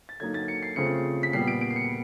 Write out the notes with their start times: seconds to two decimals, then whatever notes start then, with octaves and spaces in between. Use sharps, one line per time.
0.09 A6
0.20 D3 F#3 A#3 D#4 G#6
0.34 A6
0.48 C#7
0.63 C7
0.76 C#3 F3 A3 C4 C#7
1.23 B6
1.33 A#2 G3 B3 C7
1.48 D7
1.61 D7
1.71 C7
1.76 C#7